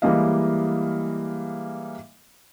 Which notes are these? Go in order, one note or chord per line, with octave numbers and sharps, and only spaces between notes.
E3 G3 G#3 A#3 D#5 F5